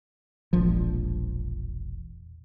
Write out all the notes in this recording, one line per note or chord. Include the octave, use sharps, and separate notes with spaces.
E1 A#1 F3